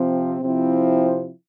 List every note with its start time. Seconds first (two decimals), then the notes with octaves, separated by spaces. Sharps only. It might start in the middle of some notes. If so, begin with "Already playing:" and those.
Already playing: C3 F3 C4
0.40 C3 F3 C4 E4